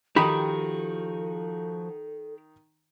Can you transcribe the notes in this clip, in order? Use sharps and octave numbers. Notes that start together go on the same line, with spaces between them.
D#3 F3 D#4 F#4 G4 A4 B5 D#6